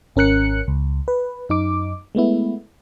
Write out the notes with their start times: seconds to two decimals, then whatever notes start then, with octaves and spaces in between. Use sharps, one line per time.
0.16 G#1 C#4 A#4 F#6 C#7
0.68 C#2
1.08 B4
1.49 F#2 D#4 D6
2.15 G#3 A3 B3 E4